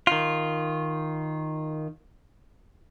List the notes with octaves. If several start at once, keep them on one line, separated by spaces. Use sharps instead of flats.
D#3 F4